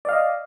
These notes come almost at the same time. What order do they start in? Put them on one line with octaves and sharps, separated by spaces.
D5 F5 D#5